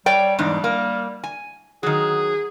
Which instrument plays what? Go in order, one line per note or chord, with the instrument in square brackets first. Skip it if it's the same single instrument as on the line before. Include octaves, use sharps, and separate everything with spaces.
[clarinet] G3 [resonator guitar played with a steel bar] C#5 D5 G5
[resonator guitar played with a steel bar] E2 G#2 D4
A#3
G#5
[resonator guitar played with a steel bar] D#3 F#3 [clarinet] G#4